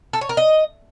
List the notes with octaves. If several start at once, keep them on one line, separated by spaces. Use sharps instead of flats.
A4
C#5
A#4
D#5